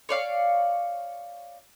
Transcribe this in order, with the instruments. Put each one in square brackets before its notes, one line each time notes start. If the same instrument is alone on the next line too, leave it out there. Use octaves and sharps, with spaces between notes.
[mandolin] C#5 D5 F5